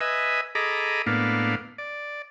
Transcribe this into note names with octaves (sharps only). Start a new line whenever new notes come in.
B4 D#5 E5 G#5
G#4 A4 D#5 A#5 B5 D6
A2 A#3 B3 D4 F5
D5